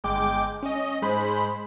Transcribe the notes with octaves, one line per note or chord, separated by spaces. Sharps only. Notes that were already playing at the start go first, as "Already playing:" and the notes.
G1 G#3 G5 D6
C#4 D#5
G#2 G#3 C5 B5